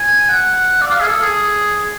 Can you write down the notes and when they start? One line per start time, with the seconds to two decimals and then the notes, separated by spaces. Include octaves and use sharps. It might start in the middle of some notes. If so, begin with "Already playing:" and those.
Already playing: G#5
0.29 F#5
0.81 D5
0.91 F5
1.01 G#4
1.07 A4
1.23 G#4